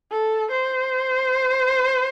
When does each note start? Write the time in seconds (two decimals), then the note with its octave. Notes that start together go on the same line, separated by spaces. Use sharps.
0.11 A4
0.51 C5